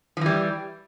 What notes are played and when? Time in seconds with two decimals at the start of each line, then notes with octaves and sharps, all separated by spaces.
0.17 F3
0.21 E3
0.26 G3